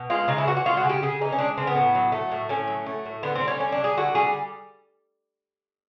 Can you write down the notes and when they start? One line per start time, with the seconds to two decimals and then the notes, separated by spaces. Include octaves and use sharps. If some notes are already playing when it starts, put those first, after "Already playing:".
Already playing: B2
0.10 G#3 F4
0.28 C#3 D#4
0.38 E4
0.46 E3 F#4
0.57 F#4
0.65 G#3 F4
0.77 F#4
0.83 C#3
0.89 G4
1.02 C#3 G#4
1.21 E3 D#4
1.32 C#4
1.39 G#3 D4
1.58 C#3 C4
1.67 B3
1.75 A2
1.95 F#3
2.12 A3
2.32 A2
2.49 A2 C#4
2.67 F#3
2.86 A3
3.05 A2
3.23 D3 B3
3.35 C4
3.41 G3
3.48 C#4
3.60 D3 C#4
3.72 D4
3.78 G3
3.84 G#4
3.97 D3 F#4
4.15 G3 G#4